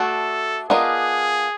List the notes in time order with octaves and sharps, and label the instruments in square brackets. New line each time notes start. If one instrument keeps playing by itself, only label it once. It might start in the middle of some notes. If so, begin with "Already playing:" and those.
Already playing: [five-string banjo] A3 D4 F#4 [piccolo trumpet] A4
[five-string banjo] B3 D4 F4 A#4 D#5 [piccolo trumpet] G#4